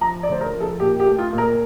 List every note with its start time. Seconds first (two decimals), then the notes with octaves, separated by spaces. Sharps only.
0.01 F3 A#5
0.23 D5
0.28 D2 C5
0.41 A#4
0.53 F3
0.60 A4
0.80 A#2 G4
1.00 G4
1.05 A3
1.18 F4
1.32 A#2
1.38 A#4